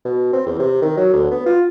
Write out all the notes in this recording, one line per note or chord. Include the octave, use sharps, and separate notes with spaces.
B2
C4
E2
C3
D#3
F#3
D2
B3
F4